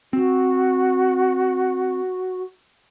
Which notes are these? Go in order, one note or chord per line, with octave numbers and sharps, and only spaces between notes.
C4 F#4